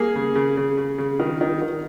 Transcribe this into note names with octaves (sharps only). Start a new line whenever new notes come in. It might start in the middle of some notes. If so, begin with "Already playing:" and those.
Already playing: A#3 G#4
C#3
C#3
C#3
C#3
C#3
D#3
D#3
D#3